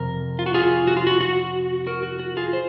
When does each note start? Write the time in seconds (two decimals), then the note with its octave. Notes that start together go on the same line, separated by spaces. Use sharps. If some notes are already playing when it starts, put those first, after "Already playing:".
Already playing: F2 C3 A#4
0.39 F4
0.46 F#4
0.54 F4 G#4
0.87 F#4
0.97 F4
1.07 F#4
1.21 F#4
1.87 F#4 A#4
2.03 F#4
2.19 F#4
2.37 F4 G#4
2.53 C5